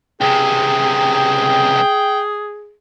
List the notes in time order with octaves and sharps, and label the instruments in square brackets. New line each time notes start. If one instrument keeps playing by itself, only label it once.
[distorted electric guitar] C#2 C3 [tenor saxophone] G#4 [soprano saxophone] G5